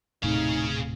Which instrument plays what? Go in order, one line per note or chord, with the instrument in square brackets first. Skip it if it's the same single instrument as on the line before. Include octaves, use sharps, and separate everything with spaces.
[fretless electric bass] D#1 A2 C3 [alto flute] D#4 [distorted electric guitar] G#4 F5